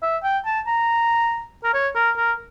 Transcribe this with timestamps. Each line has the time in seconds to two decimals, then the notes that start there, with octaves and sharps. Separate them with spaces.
0.02 E5
0.24 G5
0.45 A5
0.67 A#5
1.64 A#4
1.73 C#5
1.95 A#4
2.17 A#4